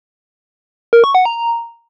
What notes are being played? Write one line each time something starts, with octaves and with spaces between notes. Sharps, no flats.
A#4
C#6
F#5
A#5